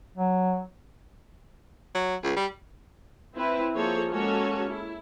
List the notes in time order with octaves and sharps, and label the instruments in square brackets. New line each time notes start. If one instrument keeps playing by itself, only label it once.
[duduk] F#3
[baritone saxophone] F#3
C#2
G3
[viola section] C4 E4 B4
F3 A#3 G#4 A4 C5 C#5
G#3 A#3 C#4 F#4 A4 C#5
E4